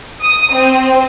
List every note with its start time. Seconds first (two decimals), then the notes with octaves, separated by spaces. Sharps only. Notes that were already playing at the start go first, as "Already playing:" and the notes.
0.22 D#6
0.55 C4